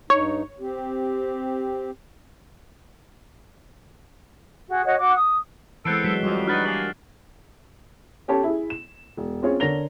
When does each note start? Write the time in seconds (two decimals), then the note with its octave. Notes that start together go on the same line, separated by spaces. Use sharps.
0.10 G2 D#4 C#5
0.60 C4 G4
4.68 F#4 G#4
4.84 F#4 C#5 D#5 F#5
4.98 F#4 F#5 D6
5.14 D#6
5.85 E3 G#3 B3 C4 A4 F#6 C7 D7
6.04 F#3 G#3 F#4 B6 E7 G7
6.23 F2 G3 F#4
6.48 D4 D#4 F#4 G4 B4 F6 F#6 A6
6.66 G#3 A#3 F#7
8.28 C#4 G4 A4 C#5 A5
8.43 E4 G#4
8.70 E7
9.17 E1
9.43 C4 C#4 F4 G#4 C#5
9.60 D3 A#4 C#5 A#6 F7 G7